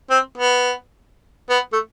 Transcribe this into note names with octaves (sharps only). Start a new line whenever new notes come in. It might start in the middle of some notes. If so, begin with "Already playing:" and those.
C4
B3
B3
A3